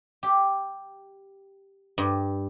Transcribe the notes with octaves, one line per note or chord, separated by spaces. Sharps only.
G4
G2